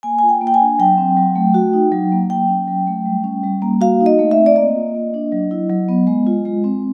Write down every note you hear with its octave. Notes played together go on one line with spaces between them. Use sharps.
A#3 G#5
G#5
F4
G5
A#3
G5
G#5
D4
F#3 G5
C4
F#3
A3
F#4
D#4
F#3
A#3
F#3 G5
C#4
F#3
A3
G3
C#4
G3
A#3
F#4 F5
D#4
D#5
A3
E5
C4
D5
A#3 D#5
F4
A#3
D4
F#3
E4
F#3
B3
G#3
F4
G#3
C4